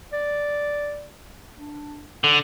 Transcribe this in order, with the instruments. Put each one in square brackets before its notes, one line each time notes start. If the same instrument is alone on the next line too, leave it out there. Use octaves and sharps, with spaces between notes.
[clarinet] D5
D4
[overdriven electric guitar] D3 [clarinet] F#5